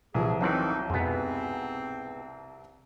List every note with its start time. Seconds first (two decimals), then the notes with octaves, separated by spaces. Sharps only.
0.14 C2 E3 F3 G#4
0.41 F2 D#3 E3 F#3 C4 D#4 F#4
0.90 F2 G#2 B2 B3 C4